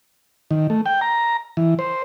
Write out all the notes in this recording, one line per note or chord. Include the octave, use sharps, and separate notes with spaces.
D#3
A3
G5
A#5
E3
C5